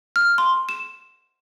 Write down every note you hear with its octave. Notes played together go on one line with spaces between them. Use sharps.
F6
C6
E7